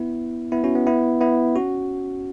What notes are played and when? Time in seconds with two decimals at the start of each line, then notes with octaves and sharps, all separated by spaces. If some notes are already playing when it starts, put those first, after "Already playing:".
Already playing: B3 E4
0.52 B3 E4
0.64 C#4 F#4
0.75 B3
0.87 B3 E4
1.21 B3 E4
1.55 C#4 F#4